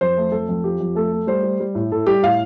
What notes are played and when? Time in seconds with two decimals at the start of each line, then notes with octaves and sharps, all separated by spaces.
0.01 F2 C5
0.17 A3
0.32 F2 A4
0.49 F2
0.64 F3 G4
0.80 F2
0.95 A3 A4
1.12 A3
1.27 G3 C5
1.43 G3
1.60 G3
1.75 A2
1.92 A2 A4
2.07 G3 G4
2.22 A2 F5